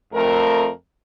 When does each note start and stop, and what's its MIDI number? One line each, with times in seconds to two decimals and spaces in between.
0.14 0.69 41
0.14 0.69 57
0.14 0.69 70